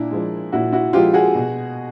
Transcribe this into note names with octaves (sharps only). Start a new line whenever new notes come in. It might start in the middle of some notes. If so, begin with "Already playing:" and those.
Already playing: A#2 D4 E4
F3 G#3
A#2 E4 F#4
E4 F#4
F3 G#3 F4 G4
F#4 G#4
B2